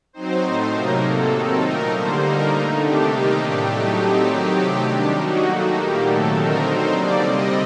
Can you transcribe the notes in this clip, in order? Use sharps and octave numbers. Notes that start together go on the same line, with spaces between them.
F#3 C4 D#4 C5
A2 A3 D#4 C5
C3 F#3 A#3 D#4 A#4
C3 F#3 A#3 A4
D#3 F#3 C4 D#4 A4
A#2 A3 D#4 A#4
D3 G3 A#3 C5
D3 G3 A#3 D#4 A#4
D3 A3 D#4
C3 D#3 A3 D4 G4
C3 G3 A#3 D#4 G4
A2 A3 D4
A2 F#3 A3 D#4 G4
F#3 A3 C4 D#4 G4
D#3 F#3 C4 D#4 G4
C3 F#3 A3 G4
D#3 G3 D4 G4
F#3 A#3 D#4 F#4
D#3 A3 D#4
A#2 G3 A#3 G4
C3 D#3 F#3 A3 A4
D3 A3 C4 D#4 A#4
F#3 C4 D#4 C5
D3 G3 A#3 D5
C3 G3 C4 D#5